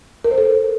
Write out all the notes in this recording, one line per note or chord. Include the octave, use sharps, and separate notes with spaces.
A#4
C5
A4